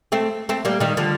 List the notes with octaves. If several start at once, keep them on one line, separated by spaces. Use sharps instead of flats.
A3 C4
A3 C4
G3 A#3
D#3 G3
D3 F3